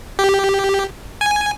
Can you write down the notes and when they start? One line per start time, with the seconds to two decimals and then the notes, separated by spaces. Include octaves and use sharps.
0.19 G4
1.21 G#5